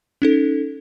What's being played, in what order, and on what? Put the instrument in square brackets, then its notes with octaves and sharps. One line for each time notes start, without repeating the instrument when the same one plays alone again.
[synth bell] C#4 D#4 A4